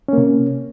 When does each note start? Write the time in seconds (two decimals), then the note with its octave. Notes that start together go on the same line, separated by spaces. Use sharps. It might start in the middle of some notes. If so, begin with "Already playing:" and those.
0.08 C#4
0.13 A#3
0.17 C3